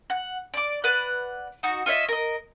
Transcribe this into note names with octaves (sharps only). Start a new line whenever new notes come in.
F#5
D5 D6
B4 D5 F#5 F#6
D#4 F#4
F4 C#5 D#5 E5
A#4 D#5